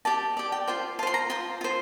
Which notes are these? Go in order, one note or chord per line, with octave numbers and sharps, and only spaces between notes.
G4 D5 A5
G4 D5
G5
F4 C5 G5
F4 C5 A5 C6
A#5
F4 C5 C6
F4 C5